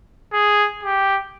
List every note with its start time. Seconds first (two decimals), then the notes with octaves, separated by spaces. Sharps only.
0.33 G#4
0.83 G4